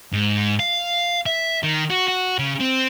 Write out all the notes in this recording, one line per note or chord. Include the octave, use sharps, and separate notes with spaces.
G#2
F5
E5
D#3
F#4
F#4
C#3
C4